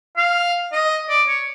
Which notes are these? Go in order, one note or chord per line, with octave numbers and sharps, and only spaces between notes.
F5
D#5
D5
C#5